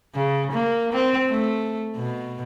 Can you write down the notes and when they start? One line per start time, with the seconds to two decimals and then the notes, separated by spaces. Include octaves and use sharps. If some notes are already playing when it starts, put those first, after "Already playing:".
0.15 C#3
0.52 A#3
0.92 C4
1.29 A3
1.96 B2